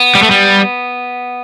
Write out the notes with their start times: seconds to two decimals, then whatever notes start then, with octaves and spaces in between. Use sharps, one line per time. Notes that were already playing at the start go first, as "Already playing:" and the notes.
Already playing: B3
0.15 G3
0.23 A3
0.31 G3